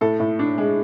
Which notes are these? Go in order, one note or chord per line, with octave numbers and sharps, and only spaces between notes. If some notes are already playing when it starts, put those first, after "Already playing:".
A2 A4
A2
D4
G#3